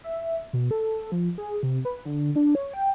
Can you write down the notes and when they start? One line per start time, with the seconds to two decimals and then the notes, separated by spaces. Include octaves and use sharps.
0.04 E5
0.53 B2
0.71 A4
1.12 F3
1.38 G#4
1.63 C3
1.85 B4
2.05 D3
2.36 D4
2.55 C#5
2.73 G5